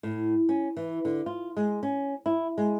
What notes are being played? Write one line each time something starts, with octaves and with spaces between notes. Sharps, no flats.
A2
C#4
E3
D3
F4
G#3
C#4
E4
G#3